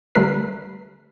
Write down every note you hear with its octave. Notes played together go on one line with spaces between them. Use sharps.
D3 G3 A3 A#4 B4 C7